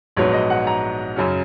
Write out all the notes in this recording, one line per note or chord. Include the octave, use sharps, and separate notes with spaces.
A#1 G#2 F#3 B3 C#5
D#5
F#5
A#5
F#2 C#3 F#3 C#4